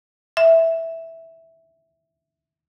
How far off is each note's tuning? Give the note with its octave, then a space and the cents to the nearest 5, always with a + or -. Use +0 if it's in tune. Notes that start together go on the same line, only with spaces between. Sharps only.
E5 -5